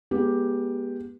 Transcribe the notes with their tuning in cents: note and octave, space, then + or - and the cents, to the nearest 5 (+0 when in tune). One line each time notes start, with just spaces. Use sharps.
G#3 +0 B3 -35 G4 +0